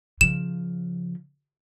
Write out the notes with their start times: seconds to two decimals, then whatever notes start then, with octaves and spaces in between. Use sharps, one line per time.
0.21 C#3 F3 E7